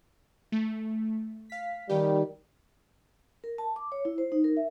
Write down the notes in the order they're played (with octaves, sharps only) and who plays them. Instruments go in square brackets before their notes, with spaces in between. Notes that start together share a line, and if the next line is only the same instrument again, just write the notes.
[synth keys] A3
F5 B6
[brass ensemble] D#3 G3 [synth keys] C#4 G4
[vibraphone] A#4
A5
D6
C#5
E4
C5
D#4
A#4
E5